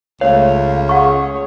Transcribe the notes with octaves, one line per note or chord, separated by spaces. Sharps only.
C#2 A3 C#4 C#5 F5
G#4 C#5 F#5 C#6